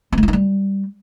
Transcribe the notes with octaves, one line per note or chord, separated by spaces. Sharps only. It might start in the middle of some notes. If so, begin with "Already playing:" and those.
C4
G#3
E4
D#4
G3